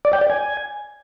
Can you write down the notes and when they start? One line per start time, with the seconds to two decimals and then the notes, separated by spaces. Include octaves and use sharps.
0.05 D5
0.13 G5
0.21 D5
0.30 G#5